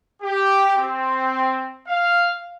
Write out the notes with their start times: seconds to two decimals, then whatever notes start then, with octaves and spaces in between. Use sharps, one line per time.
0.22 G4
0.76 C4
1.88 F5